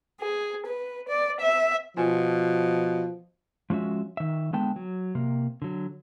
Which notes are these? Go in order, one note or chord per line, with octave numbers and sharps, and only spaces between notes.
G#4
B4
D5
E5
B2 F3 F4 G#5
F3 G#3 C#4 F#4 E5
D#3 E5
D3 G#3 B3 G5 A5
F#3
C3 A#3
D3 F#3